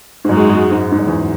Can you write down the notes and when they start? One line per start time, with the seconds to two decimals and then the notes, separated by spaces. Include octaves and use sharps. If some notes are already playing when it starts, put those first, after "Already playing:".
0.25 G#2
0.29 F#2 G#3 D#4 F#4
0.49 F#2
0.71 G#2
0.92 G#2
0.99 F#2
1.07 E2